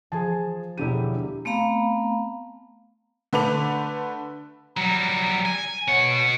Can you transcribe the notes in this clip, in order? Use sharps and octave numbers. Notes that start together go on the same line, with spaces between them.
F3 G#4 G#5 A5
E1 D3 E4 G4 D#7
A3 B3 C4 F5 A#5 B5
D3 A3 B4 D6 F7
F#3 G3 A#5
G#5
B2 C#5 F#5